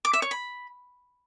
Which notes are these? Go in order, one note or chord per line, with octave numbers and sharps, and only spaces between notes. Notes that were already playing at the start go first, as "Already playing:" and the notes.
D6
E5
C#5
B5